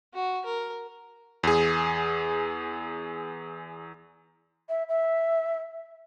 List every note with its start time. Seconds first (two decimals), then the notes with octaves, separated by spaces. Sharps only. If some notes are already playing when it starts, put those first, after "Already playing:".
0.15 F#4
0.45 A#4
1.43 E2 G#4
4.69 E5
4.89 E5